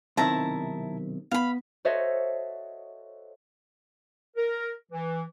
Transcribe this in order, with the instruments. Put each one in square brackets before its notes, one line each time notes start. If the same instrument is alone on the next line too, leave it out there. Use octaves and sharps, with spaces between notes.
[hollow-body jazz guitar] B1 C3 D#3 [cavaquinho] E4 A5 A#5
[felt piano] B3 [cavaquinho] F5 B5
[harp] F#4 A4 C5 C#5 D#5 E5
[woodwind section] A#4
E3